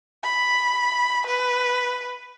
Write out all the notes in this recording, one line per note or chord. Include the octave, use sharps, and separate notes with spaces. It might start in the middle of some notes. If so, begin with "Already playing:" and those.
B5
B4